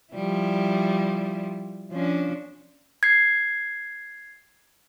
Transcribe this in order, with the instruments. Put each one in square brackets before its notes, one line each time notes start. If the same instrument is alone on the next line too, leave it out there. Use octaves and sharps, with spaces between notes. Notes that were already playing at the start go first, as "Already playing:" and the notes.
[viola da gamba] F3 G3 E4
F3 C#4 D4
[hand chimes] G#6 C7